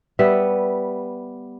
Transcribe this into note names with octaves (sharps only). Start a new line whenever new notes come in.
G3 B3 E5